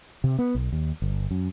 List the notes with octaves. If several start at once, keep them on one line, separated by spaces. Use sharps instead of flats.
C3
B3
B1
D#2
G1
F#2